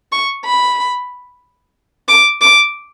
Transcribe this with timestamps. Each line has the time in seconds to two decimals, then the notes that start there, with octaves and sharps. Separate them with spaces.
0.12 C#6
0.45 B5
2.08 D6
2.41 D6